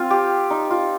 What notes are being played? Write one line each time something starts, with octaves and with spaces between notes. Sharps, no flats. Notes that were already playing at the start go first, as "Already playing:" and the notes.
Already playing: C4 F4
G4
D#4
F4